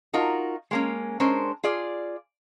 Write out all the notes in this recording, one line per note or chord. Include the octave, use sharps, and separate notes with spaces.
D#4 F4 F#4 A#4
G#3 A#3 C#4
G#3 C#4 D4 A#4 C5
F4 G#4 D5